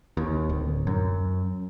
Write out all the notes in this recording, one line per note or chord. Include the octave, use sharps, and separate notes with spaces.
D#2
D1
F#2